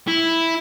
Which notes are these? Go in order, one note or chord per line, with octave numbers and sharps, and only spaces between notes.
E4